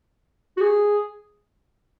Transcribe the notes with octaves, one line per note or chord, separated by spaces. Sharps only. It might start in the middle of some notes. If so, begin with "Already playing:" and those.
F#4
G#4